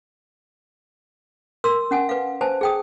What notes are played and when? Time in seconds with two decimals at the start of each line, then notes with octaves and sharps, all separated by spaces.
1.64 A#4 C6 E6
1.91 C#4 F#5 G#5
2.09 B4 F5
2.41 B4 C5 G#5 A5
2.61 G#4 G5 D#6